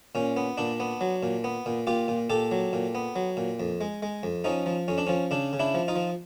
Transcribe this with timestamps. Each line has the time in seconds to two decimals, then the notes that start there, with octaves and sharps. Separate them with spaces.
0.15 A#2 C#4
0.37 B3
0.58 A#2 D4
0.80 B3
1.01 F#3
1.23 A#2
1.44 B3
1.66 A#2
1.87 A#2 F4 G4
2.08 A#2
2.30 A#2 G4 A4
2.52 F#3
2.73 A#2
2.95 B3
3.16 F#3
3.37 A#2
3.60 F2
3.81 G#3
4.02 G#3
4.23 F2
4.44 F3 C#4 D#4
4.66 F3
4.88 F2 C#4
4.98 D4
5.07 F3 C#4
5.31 C#3 D4
5.53 C#3
5.60 D4 E4
5.75 F3
5.88 D#4 F4
5.96 F3